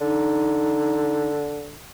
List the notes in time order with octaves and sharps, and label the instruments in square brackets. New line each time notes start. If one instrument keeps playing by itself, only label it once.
[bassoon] D3 [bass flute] D#4